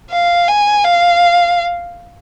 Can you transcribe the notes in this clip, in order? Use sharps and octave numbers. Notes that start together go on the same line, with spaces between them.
F5
G#5
F5